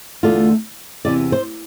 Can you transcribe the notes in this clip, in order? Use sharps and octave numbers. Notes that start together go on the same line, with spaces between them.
E2 D3 A3 D4 F4
E2 C3 E3 D5
C5